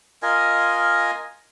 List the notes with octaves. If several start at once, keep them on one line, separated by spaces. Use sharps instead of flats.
F4 A#4 D#5 G#5